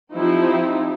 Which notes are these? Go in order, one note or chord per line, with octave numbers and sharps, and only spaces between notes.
F3 C4 D#4 E4 G4